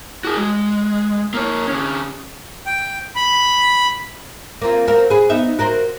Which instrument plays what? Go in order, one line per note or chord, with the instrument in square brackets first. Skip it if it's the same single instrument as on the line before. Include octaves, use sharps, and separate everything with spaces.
[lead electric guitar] F#4 G#4
G#3
A#3 C#5
D3 C#4
[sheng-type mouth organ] G5
B5
[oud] A#3 C4 F4
C4 F#4 A#4
G#4 B4
B3 D#4 E5
F#4 A#4 C5